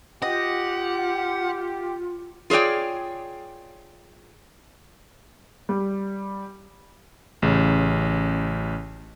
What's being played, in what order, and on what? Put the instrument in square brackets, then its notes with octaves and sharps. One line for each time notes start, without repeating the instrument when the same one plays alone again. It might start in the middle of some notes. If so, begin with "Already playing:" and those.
[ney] F4 [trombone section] G4 [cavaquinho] D#5 [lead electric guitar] F#5
[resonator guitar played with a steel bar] F4 G#4 C#5 D5 G5
[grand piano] G3
[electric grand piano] A1 C#3